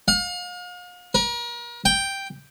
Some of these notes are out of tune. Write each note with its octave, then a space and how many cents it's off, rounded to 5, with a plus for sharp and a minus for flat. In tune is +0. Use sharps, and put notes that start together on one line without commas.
F5 +40
A#4 +40
G5 +0